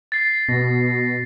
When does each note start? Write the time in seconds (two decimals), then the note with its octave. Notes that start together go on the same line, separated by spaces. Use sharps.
0.12 A6 C7
0.49 B2 A#6